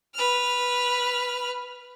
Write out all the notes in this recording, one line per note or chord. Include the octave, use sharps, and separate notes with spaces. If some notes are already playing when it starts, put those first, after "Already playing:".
B4 F6